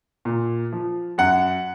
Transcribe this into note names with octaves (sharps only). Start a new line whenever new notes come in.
A#2
F3
F#2 F#5